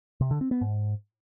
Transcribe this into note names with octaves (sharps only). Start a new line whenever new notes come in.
C3
D3
C4
B3
G#2